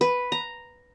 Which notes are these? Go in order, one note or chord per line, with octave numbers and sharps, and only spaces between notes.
B4
A#5